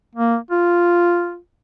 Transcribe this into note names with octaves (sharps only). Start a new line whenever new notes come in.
A#3
F4